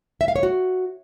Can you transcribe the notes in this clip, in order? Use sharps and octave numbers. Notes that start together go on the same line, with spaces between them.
E5
F5
C#5
F#4